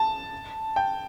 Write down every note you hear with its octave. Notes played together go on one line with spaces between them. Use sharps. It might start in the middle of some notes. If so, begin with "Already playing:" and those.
Already playing: A5
G5